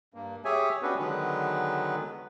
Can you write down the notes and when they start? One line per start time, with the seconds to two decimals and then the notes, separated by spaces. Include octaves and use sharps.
0.14 G2 A#3
0.45 G4 G#4 C#5 E5 G#5
0.82 B3 C#4 D4 F#4 G4 B4
0.99 D3 D#3 F#3 G#3 B3 B4